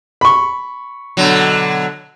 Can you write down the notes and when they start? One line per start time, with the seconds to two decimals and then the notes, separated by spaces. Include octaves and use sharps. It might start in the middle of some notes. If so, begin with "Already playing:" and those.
0.21 B5 C#6
1.17 B2 D3 F#3